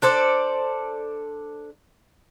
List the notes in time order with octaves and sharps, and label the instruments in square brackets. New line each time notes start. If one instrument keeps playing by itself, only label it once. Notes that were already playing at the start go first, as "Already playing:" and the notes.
[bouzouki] D4 A4 C5 D5